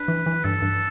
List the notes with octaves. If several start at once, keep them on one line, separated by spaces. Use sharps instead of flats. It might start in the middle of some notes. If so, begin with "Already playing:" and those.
Already playing: D4 B4
E3
E3
G2 A4
G2